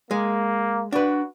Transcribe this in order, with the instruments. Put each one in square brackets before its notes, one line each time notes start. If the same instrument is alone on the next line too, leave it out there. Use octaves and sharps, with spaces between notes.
[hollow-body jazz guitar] G#3 [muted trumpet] A#3
[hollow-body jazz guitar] D4 B4 [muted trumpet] F#4